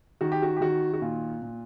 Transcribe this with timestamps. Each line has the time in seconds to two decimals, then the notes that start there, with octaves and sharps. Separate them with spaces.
0.21 D#3 F#4
0.32 G4
0.42 F#4
0.57 G4
0.61 D#3 F#4
0.94 F#4
1.01 A#2 F4
1.42 A#2